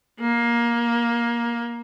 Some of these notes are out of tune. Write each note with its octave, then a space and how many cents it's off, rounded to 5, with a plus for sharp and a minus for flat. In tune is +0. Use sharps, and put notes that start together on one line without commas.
A#3 +20